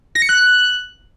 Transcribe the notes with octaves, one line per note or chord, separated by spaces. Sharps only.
A#6
C#7
F#6